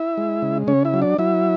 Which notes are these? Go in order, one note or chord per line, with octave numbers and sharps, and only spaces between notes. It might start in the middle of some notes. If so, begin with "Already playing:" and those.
Already playing: E4 E5
G#3
C#3
C#3 C#4 C#5
E4 E5
F#3
D4 D5
F#3 E4 E5